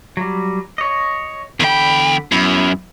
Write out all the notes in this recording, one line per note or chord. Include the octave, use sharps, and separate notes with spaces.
F#3 G3
C#5 D#5
E2 D3 G5 B5
F#2 B3 E4